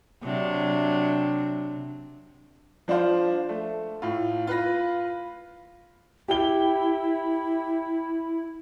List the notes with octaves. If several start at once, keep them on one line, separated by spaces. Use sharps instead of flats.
C3 F#3 D4
F3 D4 F4 C5 F5
A3
A2 F4
F4 B4 B5 A#6
E4 G4 G5 G7